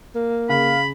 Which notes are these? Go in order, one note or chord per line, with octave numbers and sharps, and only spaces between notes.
A#3
C#3 F5 B5